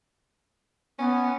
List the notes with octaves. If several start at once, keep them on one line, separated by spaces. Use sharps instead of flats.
B3 C#4